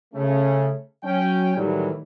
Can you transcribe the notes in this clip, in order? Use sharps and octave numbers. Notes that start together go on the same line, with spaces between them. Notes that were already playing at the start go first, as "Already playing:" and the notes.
C#3 A3 C#4
F#3 C#4 G5
A2 D#3 E3 F#3 G3